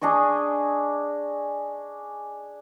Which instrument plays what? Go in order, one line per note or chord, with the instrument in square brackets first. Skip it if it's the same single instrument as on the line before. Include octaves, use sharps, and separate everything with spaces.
[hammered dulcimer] D4 G#4 D#5 C#6